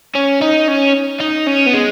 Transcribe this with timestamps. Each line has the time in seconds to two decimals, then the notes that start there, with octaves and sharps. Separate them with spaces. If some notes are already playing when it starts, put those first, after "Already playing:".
0.15 C#4
0.42 D#4
0.68 C#4
1.20 D#4
1.47 C#4
1.67 B3
1.74 G#3